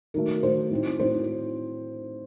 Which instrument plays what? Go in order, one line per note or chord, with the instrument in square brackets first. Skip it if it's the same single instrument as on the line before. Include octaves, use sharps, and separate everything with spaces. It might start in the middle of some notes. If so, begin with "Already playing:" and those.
[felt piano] D#3 F#3 A3 A#4
D#3 F#3 A3 C5
A2 F#3 C4 D#4
A2 F#3 C4 D#4 C5